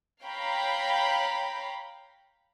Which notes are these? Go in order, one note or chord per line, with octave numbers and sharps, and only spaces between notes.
C#5 F5 G5 A#5 B5